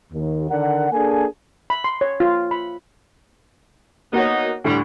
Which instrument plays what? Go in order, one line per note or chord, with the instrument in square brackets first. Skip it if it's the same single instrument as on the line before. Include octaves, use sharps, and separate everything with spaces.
[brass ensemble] D#2
D3 D#3 A#4 D5 F#5
A#3 D4 G#4 A4 G#5
[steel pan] B5
C6
C#5
F4
B5
[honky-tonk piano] A#3 F#4 C#5 [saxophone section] B3 D#4
[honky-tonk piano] D2 A2 D3 [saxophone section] G3